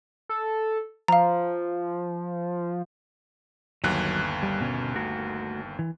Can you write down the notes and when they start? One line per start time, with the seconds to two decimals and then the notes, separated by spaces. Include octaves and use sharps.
0.29 A4
1.08 F3 F5 A#5
3.84 G1 D#2 F#3 F#6
4.43 G3
4.61 B2 C#4
4.96 A3 F#4 A#4
5.79 E3